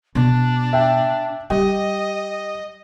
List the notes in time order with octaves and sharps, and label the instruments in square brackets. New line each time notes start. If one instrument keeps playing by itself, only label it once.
[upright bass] B2 [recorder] D4
[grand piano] E5 G5
[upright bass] G3 [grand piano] G4 [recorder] D#5